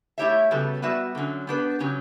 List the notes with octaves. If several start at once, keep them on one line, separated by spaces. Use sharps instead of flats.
A3 E4 G4 C#5 E5
C#3 G3 B3 F#4 A4
G3 B3 F#4 B4 E5
D3 F#3 C#4
B3 D4 G4 B4
C#3 F#3 C#4 G4